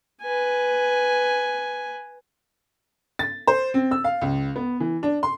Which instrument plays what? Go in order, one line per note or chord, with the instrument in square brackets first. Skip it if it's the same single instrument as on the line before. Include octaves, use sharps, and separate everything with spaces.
[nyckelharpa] B4 G#5
[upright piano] A6
C5
C4
E6
F5
C#2
B3
E3
D4
C6